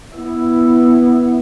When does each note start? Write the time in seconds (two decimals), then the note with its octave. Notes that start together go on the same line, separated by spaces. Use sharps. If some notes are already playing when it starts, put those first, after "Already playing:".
0.14 B3 E4